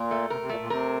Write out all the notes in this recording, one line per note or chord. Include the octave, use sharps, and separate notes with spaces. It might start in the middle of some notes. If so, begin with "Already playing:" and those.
Already playing: A#2 A#4
A3
C3 A#4
C3
A#2 A3
A#2
C3 A#4